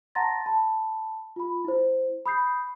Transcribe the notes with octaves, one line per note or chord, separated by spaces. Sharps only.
F#5 A5 A#5 C6 A6 A#6
A5 B5
F4 B5
E4 C5
B5 D#6 G6 C7